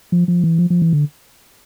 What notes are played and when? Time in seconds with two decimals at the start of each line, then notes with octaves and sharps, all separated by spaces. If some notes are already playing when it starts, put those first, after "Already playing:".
0.12 F3
0.28 F3
0.44 E3
0.58 F3
0.70 F3
0.82 E3
0.93 D3